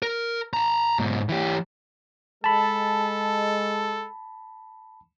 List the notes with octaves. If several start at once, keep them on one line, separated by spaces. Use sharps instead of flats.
A#4
A5 A#5
G#2 B2
E3 G4
G#3 A4 A5 B5